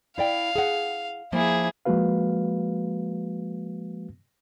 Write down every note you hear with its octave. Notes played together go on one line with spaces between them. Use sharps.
E4 D5 F5 G5
G#4 F#5
F3 A#3 E4 G#4
F3 G#3 A#3 F#4 B4 F5